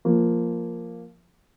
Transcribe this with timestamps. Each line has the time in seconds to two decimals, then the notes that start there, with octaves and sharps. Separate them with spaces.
0.05 F3 A#3